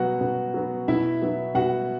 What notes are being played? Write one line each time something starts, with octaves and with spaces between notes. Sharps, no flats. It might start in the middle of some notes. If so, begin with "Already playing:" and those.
Already playing: B2 F#3 B3 F#4 F#5
B2
F#3 B3
B2 E4 E5
F#3 B3 E4
B2 F#4 F#5